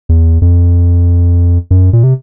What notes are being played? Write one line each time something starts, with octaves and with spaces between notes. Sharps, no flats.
E2
F2
F#2
A#2
C3